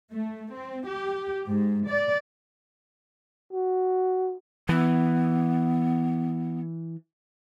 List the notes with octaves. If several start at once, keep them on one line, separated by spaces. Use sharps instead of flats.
A3
C4
G4
G#2
D5
F#4
E3 B3